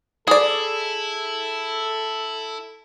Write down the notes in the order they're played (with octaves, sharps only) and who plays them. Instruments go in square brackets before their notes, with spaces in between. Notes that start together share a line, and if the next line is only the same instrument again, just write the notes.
[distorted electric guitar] E4 [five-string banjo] G#4 D5 [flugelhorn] A4